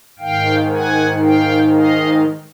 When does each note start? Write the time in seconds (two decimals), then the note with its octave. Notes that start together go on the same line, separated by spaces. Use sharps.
0.19 G#2 D#3 F5 G5
0.70 F#5 G#5
1.22 F5 G5
1.74 D#5 F5